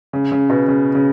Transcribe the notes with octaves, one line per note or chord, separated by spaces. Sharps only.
C#3
C#3
B2
C#3
C#3